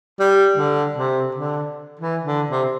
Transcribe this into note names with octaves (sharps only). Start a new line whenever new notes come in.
G3
D3
C3
D3
E3
D3
C3